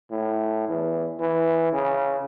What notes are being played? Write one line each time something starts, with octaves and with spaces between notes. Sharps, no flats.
A2
E2
E3
C#3